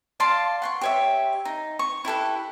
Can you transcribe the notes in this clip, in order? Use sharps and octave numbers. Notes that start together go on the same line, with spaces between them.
D5 F5 A5 C6
F#5 C6 C#6
G4 C#5 E5
D#4
C#6
E4 G4 A4 B4